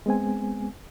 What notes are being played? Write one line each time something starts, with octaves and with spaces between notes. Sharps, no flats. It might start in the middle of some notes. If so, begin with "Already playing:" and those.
G#3 B3 C4 G#5